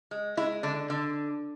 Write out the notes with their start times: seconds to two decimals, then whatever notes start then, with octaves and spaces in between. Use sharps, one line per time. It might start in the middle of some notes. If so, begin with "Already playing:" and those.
0.11 G#3
0.37 G#3 E4
0.63 D3 D4
0.90 D3